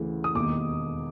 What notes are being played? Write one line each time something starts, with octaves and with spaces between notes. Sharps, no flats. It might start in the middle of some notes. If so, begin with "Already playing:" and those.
Already playing: D2 C#3 E3
D#6
E1 D#2 D#3 D6